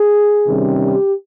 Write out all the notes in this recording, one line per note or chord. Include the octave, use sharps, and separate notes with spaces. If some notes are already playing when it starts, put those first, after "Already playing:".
Already playing: G#4
C3 D#3 G3 C#4
G4